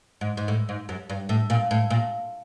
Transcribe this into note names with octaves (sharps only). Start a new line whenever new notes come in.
G#2
G#2
A2
G#2
F#2
G2
A2
A#2
A2
A#2